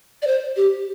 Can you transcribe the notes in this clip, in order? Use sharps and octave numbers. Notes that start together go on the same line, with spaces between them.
D5
C5
G4